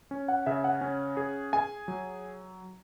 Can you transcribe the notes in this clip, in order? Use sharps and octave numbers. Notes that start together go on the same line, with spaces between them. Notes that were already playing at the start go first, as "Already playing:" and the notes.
C#4
F#5
C#3 E5
F#5
C#4
G#4
G#4 G#5
F#3